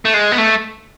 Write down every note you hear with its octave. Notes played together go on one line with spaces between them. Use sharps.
A3
G#3
B3
A3